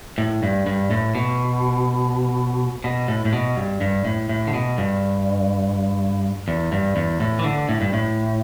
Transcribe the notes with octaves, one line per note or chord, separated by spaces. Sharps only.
A2
G2
G2
A2
B2
B2
A2
A2
B2
G2
G2
A2
A2
D3
B2
G2
E2
G2
E2
A2
E3
D3
A2
G2
A2